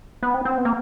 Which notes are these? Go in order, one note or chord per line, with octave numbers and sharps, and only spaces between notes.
B3
C4
C4
B3
A#3